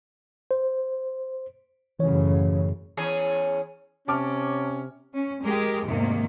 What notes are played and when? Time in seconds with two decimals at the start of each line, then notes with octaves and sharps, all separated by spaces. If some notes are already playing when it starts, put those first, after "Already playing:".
0.51 C5
1.99 F#2 A2 C#3 E3 C#5
2.97 E2 C#4 G#4
4.08 C3 C#4 A5 D6 F6
5.15 C#4
5.43 G#3 G4 G#4 A#4
5.85 E2 G#2 C3 D#3 A3 A#3